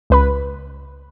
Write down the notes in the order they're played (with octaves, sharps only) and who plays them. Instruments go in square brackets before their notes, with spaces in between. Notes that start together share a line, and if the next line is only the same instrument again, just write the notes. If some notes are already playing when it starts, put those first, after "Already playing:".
[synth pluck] C#2 B4 B5